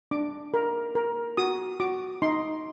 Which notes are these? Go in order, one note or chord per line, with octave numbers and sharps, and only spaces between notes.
D4 D6
A#4
A#4
F#4 D#6
F#4 D6
D#4 C6